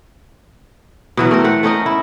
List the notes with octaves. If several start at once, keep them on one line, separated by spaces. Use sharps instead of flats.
B2 E3 F#3
A3 C4 A#4
A3 C5 F#5
A3 C#4 D#4 A#4
E4